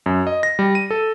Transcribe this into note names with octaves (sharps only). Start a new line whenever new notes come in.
F#2
D#5
A#6
G3
D#7
A4